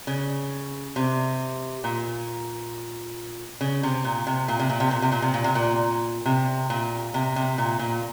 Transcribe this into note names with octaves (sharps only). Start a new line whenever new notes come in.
C#3
C3
A#2
C#3
C3
A#2
C3
A#2
C3
A#2
C3
A#2
C3
A#2
C3
A#2
C3
A#2
C3
A#2
C3
C3
A#2
A#2